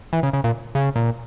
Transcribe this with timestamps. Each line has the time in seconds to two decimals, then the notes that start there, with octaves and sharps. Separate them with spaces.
0.13 E3
0.23 C#3
0.33 C#3
0.44 A#2
0.75 C#3
0.96 A#2